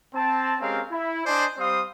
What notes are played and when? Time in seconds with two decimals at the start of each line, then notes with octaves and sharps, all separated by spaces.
0.14 C4 A5
0.61 G#3 C4 C#4 G4 A#4 F5
0.91 E4
1.26 D4 C5 D5 D#5 G#5 C6
1.58 G3 C4 C5 F5 C6 D#6